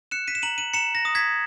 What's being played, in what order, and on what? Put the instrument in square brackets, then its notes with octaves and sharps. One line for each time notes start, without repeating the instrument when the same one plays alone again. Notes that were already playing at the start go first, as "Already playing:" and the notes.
[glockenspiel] F#6 C#7 E7
B6 D#7
E7
A#5 D#7 F#7
D#7 F#7
A#5 C#7 E7
A#6
D#6
G#6 B6